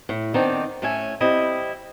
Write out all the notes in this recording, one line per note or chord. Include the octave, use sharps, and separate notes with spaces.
A2
D#3 B3 C4 D4 D#4 D5
A2 A3 C#4 E5 G#5
G3 C4 E4 D#5